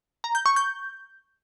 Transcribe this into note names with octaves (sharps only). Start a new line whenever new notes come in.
A#5
G6
C#6
G6